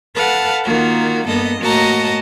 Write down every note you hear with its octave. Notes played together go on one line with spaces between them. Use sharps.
A4 B4 F5 F#5 A5
D#3 A#3 F4 F#4
G2 A#3 B3 A4 D#5
A2 A#3 F#4 D#5 A5 A#5